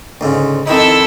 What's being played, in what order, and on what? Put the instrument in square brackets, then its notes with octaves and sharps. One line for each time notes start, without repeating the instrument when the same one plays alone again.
[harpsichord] D2 G#2 C#3
[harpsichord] F2 D#3 D#4 [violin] E4 A4